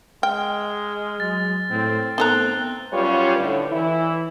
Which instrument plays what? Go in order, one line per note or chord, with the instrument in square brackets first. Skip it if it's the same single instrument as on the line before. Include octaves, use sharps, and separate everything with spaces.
[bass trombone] G#3 [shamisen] G5 [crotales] F6
[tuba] F#3 [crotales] A6
[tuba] A2 [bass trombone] C4
[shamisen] D#3 A3 A#5 [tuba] B3 [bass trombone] C4 [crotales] F#6 G7
[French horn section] F#2 G3 C#4 F4 B4 C#5
A2 D3
E3 E4